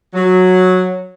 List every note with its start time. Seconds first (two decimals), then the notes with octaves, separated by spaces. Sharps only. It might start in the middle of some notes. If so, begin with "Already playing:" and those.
0.14 F#3